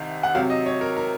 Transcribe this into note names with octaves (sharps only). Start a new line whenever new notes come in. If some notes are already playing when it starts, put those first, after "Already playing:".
Already playing: C2 C3 D#3
F#5
C3 F#3 C4 F5
D#5
C#5
A#4
A#4